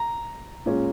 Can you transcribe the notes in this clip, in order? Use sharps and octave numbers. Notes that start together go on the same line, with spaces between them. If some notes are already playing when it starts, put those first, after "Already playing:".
Already playing: A#5
A#2 G#3 C#4